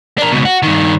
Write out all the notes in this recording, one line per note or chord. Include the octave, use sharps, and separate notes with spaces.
D4 A#4
C#2 B2
F#4
G2 D#3